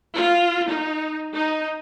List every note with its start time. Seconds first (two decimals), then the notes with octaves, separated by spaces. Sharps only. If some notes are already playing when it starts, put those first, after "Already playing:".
0.14 F4
0.67 D#4
1.33 D#4